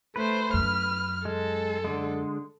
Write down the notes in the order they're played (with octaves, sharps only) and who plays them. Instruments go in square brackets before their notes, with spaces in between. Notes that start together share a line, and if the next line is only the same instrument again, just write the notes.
[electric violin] A3 C5 [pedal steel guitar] B4
[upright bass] F#2 [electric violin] F6
[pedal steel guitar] G#3 [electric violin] A4
[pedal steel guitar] D3 G#3